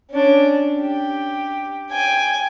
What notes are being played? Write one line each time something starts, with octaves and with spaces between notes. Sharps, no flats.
C#4 D4
G4
G5 G#5